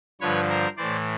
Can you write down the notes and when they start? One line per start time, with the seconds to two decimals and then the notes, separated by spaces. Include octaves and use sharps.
0.21 G2 D3 F3 B4 C#5
0.49 A#4 C5
0.77 A2 E3 C5 D5